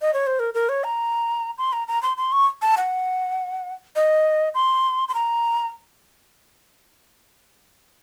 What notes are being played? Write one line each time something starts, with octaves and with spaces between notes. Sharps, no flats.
D#5
C#5
C5
A#4
A#4
C#5
A#5
C6
A#5
A#5
C6
C6
C#6
A5
F#5
D#5
C6
C6
A#5